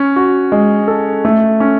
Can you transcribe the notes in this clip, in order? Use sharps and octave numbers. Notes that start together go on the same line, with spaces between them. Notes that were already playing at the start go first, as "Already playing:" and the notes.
Already playing: C#4
F#4
G#3
A4
A3
C#4